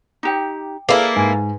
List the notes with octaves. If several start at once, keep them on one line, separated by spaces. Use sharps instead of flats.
D#4 G4 G5 D6
A#3 E4 G#4 A4 B4 F5
G#2 G#5